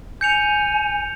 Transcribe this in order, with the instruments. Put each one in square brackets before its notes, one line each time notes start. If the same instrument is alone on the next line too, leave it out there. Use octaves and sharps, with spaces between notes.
[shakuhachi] G#5 [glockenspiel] G6 C#7 F7